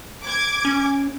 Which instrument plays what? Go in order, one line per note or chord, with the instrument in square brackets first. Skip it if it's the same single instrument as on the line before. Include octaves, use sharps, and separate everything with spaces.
[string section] D6 G#6
[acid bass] C#4